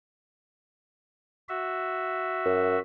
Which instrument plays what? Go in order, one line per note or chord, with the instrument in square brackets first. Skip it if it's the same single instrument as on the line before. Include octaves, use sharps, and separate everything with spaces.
[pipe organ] F#4 E5
[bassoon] F#2